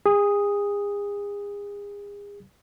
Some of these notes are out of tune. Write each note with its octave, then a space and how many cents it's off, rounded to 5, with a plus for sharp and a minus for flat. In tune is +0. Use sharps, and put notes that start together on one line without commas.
G#4 -35 D#6 +0